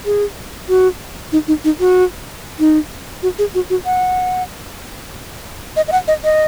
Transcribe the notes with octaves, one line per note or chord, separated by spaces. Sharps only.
G#4
F#4
D#4
D#4
D#4
F#4
D#4
F#4
G#4
F#4
F#4
F#5
D#5
D#5
F#5
D#5
D#5